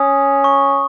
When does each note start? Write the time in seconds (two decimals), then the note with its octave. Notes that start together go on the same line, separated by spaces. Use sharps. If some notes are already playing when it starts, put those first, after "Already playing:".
Already playing: C#4 D#6
0.44 C#6